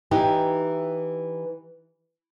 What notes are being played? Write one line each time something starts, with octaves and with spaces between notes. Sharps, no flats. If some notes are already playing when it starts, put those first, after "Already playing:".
E3 D#4 G4